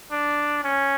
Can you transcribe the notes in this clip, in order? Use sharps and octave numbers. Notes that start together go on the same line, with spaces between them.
D4
C#4